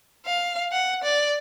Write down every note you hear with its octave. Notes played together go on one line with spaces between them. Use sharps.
F5
F#5
D5